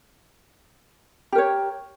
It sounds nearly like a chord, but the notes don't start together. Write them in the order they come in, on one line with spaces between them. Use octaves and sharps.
G4 A#4 C#5